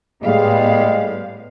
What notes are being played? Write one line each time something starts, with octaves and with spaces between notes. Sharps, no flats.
A2 G3 G#3 B3 F5